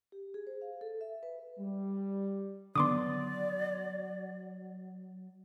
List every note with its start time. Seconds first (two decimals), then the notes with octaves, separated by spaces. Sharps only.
0.12 G4
0.34 G#4
0.47 C5
0.62 F5
0.81 A4
1.01 E5
1.23 B4
1.58 G3
2.76 D3 D#3 F#3 B3 D5 C6 D6 D#6